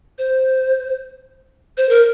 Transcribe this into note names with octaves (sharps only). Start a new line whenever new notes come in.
C5
C5
A#4